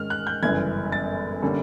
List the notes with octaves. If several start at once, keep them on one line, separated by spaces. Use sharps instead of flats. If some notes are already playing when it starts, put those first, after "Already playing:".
Already playing: G#2 D#3 G#3 C#4 F6
F#6
G6
G1 F#2 C#3 E3 G#6
A6
D3 G3 A#3 C#4